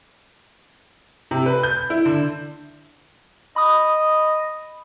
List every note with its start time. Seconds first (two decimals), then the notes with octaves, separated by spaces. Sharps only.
1.31 C3
1.46 B4
1.63 G6
1.90 E4
2.06 D3
3.56 D#5 B5 D#6